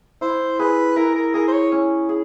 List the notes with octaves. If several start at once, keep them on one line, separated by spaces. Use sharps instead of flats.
E4 C5
G#4 B4
E4 A#4
A#4
G#4 A#4
C5
C#5
C#4
G#4